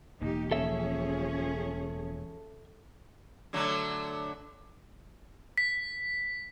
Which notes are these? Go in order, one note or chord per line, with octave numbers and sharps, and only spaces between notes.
E1 A#3 D#4 G4
F3 C#4 G#4 A4 E5
D3 F#3 A3
B6